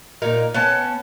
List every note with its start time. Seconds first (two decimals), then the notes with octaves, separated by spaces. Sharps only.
0.22 A#2 D#4 A#4
0.54 B3 C#4 A5